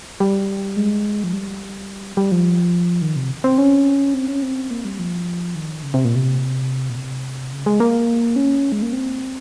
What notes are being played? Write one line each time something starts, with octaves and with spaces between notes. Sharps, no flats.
G3
G#3
F3
G3
G3
F3
D#3
C3
C4
C#4
C4
C#4
C4
A#3
G3
F3
D#3
C#3
C3
A#2
C3
A#2
C3
C#3
G#3
A#3
C#4
G#3
A#3
C4